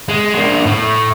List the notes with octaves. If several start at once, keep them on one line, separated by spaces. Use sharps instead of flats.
G#3
A#3 D4
A2